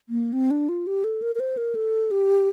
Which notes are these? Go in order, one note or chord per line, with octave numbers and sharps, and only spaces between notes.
A#3
C4
D4
F4
G4
A4
A#4
A#4
C5
A#4
A4
G4